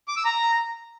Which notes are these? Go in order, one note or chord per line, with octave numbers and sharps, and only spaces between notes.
D6
E6
A#5